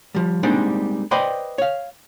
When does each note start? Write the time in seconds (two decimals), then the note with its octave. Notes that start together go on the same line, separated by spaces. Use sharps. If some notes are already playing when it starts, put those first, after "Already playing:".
0.15 F3 G3
0.43 G3 G#3 A#3 C4 D4 D#4
1.11 B4 C5 D5 D#5 G5 B5
1.58 C#5 F5